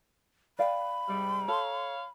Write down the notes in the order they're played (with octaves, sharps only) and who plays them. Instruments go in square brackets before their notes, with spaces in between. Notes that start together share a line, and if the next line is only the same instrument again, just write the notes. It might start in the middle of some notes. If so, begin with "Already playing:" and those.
[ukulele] D5 F5 G5 [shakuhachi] B5
[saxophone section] G#2 C3 G3
[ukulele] A4 [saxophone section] C#5 F5